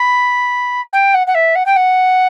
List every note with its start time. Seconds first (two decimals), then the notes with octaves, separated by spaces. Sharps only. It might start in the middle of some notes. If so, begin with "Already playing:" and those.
Already playing: B5
0.93 G5
1.14 F#5
1.27 F#5
1.34 E5
1.55 F#5
1.66 G5
1.76 F#5